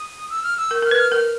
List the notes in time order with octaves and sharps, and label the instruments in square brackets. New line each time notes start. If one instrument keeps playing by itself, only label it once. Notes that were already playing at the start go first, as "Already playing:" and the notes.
Already playing: [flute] D#6
E6
F6
E6
[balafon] A#4
[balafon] A#4 [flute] F6
[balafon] B4 [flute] F#6
[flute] F6
[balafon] A#4 [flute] F6